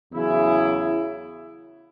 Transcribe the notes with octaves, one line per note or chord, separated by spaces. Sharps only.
E2 C#3 F#3 E4 G#4